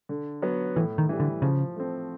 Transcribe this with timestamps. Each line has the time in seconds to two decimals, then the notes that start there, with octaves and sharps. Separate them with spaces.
0.09 D3
0.42 F#3 B3
0.76 A2 E3
0.98 D#3
1.09 E3 G3
1.20 D3
1.42 C#3 F3
1.76 A3 C4